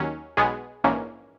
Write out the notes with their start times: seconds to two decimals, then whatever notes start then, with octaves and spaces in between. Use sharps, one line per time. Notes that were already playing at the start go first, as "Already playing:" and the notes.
Already playing: D#2 D#3 F#3 C#4
0.37 B1 B2 G#3 B3 G#4
0.84 A#1 G#2 E3 A#3 C#4